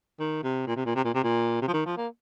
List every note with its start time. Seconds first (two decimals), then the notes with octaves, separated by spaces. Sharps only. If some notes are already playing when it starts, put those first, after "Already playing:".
0.20 D#3
0.44 C3
0.67 A#2
0.76 C3
0.86 A#2
0.96 C3
1.05 A#2
1.14 C3
1.24 A#2
1.62 C3
1.68 F3
1.74 D#3
1.86 F3
1.97 A#3